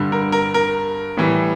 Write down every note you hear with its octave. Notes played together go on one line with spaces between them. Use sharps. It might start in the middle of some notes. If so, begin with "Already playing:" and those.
Already playing: G2 D3 G3
A#4
A#4
A#4
A2 E3 G3